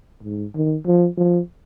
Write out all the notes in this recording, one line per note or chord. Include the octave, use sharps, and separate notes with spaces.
G#2
D#3
F3
F3